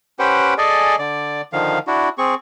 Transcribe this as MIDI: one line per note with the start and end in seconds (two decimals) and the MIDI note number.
0.19 0.54 61
0.19 0.54 67
0.19 0.54 71
0.19 0.54 72
0.19 0.54 78
0.19 0.54 79
0.58 0.96 68
0.58 0.96 69
0.58 0.96 74
0.58 0.96 75
0.58 0.96 80
0.99 1.41 50
0.99 1.41 74
1.53 1.79 50
1.53 1.79 51
1.53 1.79 53
1.53 1.79 77
1.87 2.09 62
1.87 2.09 64
1.87 2.09 66
2.18 2.35 60
2.18 2.35 68
2.18 2.35 85